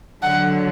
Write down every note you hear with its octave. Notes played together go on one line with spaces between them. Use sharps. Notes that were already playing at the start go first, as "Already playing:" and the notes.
D3 F#3 F#5